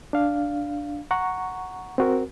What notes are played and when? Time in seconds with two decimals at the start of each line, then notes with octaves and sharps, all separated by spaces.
0.13 D4 F5
1.11 F#5 A#5 C#6
1.98 C4 F#4 A#4